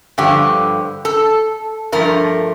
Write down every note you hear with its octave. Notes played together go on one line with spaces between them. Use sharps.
G2 D3 F3 G4
A4
G2 F3 A3 A#4